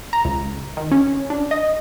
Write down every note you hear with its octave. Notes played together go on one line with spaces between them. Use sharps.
A#5
C#2
D#3
C#4
D4
D#5